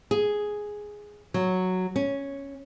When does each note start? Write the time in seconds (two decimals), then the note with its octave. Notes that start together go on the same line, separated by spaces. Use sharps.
0.11 G#4
1.34 F#3
1.96 C#4